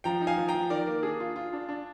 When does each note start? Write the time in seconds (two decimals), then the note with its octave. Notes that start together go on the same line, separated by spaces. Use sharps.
0.04 F3 G5 A#5
0.21 D#4
0.27 F5 G#5
0.38 F3
0.48 G5 A#5
0.54 F3
0.70 D#3 A#4 D5
0.87 A#3
1.03 D4 G#4
1.20 F4
1.36 F4
1.53 D4
1.69 D4